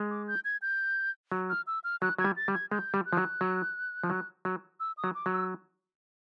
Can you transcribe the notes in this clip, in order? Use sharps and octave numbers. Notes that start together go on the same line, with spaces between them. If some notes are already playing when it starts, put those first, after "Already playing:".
Already playing: G#3
D6
G6
G#6
G6
F#3
F6
E6
F6
F#3 F#6
F#3 G#6
G3
A6
G3
G#6
G#3 G6
G3
F#6
F3
F#3
F#3
F3
F#3
F#3
E6
D#6
F#3
D6
F#3
E6